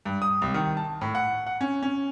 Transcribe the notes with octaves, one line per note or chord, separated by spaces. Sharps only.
G2
D#6
C2
D#3
A5
A2
F#5
F#5
C#4
C#4